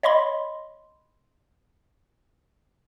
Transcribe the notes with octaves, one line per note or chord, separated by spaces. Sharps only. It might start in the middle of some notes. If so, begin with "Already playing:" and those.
C#5 D#5 B5 C6